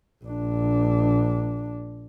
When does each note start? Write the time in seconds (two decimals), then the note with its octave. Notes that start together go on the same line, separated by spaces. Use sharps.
0.24 A#1 D4